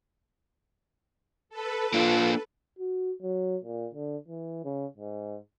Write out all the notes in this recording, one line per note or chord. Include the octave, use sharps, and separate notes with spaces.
A4 B4
A#3 D4 F4
F#4
F#3
A#2
D3
E3
C#3
G#2